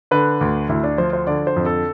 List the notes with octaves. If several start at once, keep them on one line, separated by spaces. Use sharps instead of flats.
D3 B4
D2
D2 E4
D4
F3 C5
C5
D3 D5
C5
F2
A4